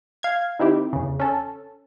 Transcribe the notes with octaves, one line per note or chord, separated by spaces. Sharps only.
F5 G#6
D#3 C4 E4 G4
E2 C#3
C#4 A4